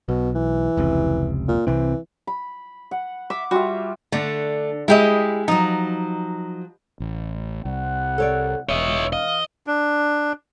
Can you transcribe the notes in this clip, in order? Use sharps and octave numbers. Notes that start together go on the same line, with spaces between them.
B1 B2
E3
F1 C#2 C3
A#2
C2 C3 E3 C4
B5
F#5
E5 D6
G3 F4 F#4 E5
D3 A3 D4
G#3 E4 G4 D#5
F3 F#3 D#4
A1
C2 F#5
A4 C#5 D5
E1 E3 C#5 D#5 E5
D#5 F5
D4